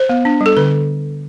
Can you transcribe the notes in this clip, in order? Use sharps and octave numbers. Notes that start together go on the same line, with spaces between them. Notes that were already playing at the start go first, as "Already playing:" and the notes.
Already playing: C5
B3
D4
G3
A4
D3 B4